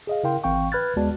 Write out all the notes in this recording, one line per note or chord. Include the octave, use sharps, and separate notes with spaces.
G#4 D#5 F5
C#3 E4 A#4 F5 G5 C6
G#1 E3 C4 F5 G5 C#6
B4 B5 F6 F#6 G#6 A6
D#2 G#3 B3 F#4 D5 A5